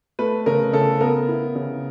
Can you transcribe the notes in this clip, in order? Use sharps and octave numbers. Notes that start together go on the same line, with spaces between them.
A3 B4
C#3 A#4
C#3 A4
B3 A#4
E4
C#3